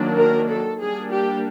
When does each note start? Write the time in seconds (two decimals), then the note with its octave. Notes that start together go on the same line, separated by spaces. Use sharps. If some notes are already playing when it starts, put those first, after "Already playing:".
Already playing: D#3 F#3 A#3 D4
0.17 A#4
0.49 A4
0.81 G3 A#3 D4 G#4
1.12 G4